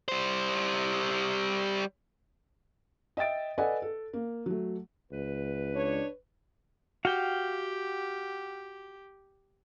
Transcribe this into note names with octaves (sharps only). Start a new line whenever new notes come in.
G3 C5
D#5 E5 G5 A6 D7
A4 B4 D5 D#5 F#5 G#5
A4
A#3
F#3 A3
C#2 B4
D4 C#5
F#4 G4 F5 G5